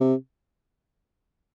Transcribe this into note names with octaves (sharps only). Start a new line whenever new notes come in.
C3